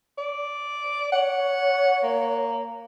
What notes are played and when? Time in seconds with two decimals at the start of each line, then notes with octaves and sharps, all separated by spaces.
0.18 D5
1.12 C#5 F#5
2.03 A#3